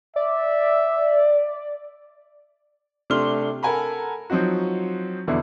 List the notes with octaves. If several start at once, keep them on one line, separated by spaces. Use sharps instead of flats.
D5 E5
C3 A3 D4 C6 F6 G7
A4 A#4 F#5 G#5 A#5 B5
F3 F#3 C4 D#4 F#4
E2 B2 D3 E4